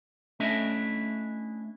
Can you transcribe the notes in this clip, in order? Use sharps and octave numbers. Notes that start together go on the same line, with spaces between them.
A3 C#4 D4 E4 D#5 E5